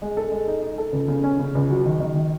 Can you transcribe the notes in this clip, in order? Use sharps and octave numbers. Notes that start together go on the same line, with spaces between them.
G#3
A4
G#3
D#4
D#4
A4
C#2
C#3
C#4
C#3
C#2
F#3
D#3
D#3
D#3